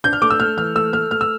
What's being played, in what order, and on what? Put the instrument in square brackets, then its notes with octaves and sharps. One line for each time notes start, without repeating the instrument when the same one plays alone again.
[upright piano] D4 G6
F6
A3 D6
E6
A3 F6
E3 F6
A3 E6
A3 F6
A3 F6
E6